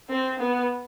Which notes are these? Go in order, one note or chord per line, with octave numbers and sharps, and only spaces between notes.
C4
B3